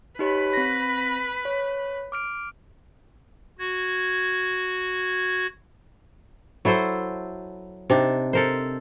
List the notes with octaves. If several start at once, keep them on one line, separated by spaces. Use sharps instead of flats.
D#4 G4 B4 C#5 B5
C4 A#6
C#5
D6 F6 D7
F#4 G#6
F#3 E4 A4 C5
C3 D4 D#4
A4 A#4 C5